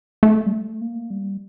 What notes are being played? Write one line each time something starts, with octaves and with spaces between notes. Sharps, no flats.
A3
G3
A3
A#3
G3